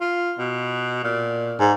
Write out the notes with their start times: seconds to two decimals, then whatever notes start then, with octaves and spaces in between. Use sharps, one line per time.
0.01 F4
0.39 B2
1.04 A#2
1.60 G#2